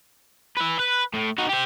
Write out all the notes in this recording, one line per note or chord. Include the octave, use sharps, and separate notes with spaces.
B4 E5
B4
A2
D#4 F#4
G4 C5